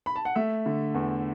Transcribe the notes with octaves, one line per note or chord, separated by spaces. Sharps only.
B5
A5
F#5
A3 E5
D3
E2